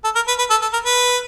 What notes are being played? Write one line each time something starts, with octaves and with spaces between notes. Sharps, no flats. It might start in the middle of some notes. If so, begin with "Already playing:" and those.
A4
A#4
B4
B4
A4
A4
A#4
B4